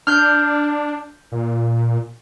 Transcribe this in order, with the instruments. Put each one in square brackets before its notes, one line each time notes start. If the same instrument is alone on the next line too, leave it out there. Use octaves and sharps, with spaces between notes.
[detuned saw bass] D4 [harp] F6 G6
[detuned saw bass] A#2